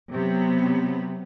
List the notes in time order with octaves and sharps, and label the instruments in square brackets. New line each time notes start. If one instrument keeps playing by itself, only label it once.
[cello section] C3 F#3 B3